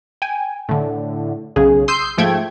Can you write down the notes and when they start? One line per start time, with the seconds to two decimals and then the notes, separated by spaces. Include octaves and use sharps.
0.22 G5 G#5
0.69 A2 D3
1.56 B1 C#3 G#4
1.88 C6 D#6 E6 G6 C7
2.18 G#2 F3 A3 G5 G#6